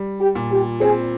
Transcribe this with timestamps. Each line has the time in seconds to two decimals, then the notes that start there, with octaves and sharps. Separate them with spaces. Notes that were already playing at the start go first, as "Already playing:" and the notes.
Already playing: G3
0.20 G4
0.35 A#2
0.50 G4
0.81 C4 G#4